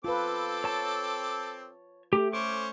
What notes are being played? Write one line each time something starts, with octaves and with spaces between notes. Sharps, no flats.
C4 F4 A4 B4 D6
C#5 A5
A3 G4
C#4 C5 C#6 D6